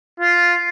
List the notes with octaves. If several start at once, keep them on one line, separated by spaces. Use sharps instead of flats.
F4